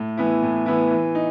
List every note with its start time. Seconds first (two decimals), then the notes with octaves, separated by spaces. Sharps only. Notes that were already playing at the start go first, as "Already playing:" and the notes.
Already playing: A2
0.17 E3 B3 E4
0.43 A2
0.66 E3 B3 E4
0.91 E3
1.15 D#4